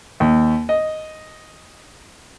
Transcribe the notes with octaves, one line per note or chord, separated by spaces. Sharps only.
D#2
D#5